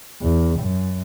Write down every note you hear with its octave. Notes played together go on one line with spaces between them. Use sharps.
E2
F#2